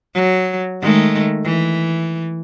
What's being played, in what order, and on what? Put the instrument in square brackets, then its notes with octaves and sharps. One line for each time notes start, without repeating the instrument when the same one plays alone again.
[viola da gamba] F#3
D#3 G#3 A3
E3